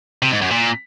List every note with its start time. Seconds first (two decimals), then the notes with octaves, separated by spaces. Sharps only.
0.22 C3
0.32 G#2
0.42 F#2
0.51 A#2